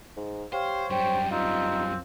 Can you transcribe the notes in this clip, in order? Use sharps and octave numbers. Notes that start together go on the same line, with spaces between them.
G#2
G4 C5 C#5 F5
F#2 G3 C5 G5
C4 D#4 F4